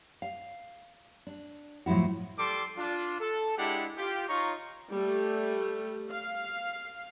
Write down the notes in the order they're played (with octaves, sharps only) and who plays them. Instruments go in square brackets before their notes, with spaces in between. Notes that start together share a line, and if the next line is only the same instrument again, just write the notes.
[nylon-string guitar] F5
D4
A2 F3 F#3 E4 F#4
[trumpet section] G3 A4 C6 D6
D4 F4
A4
G#3 D4 E4 G4 F#5
F4 G4
D#4 F4 C#5 A#5 C#6
[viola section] G3 A3
F5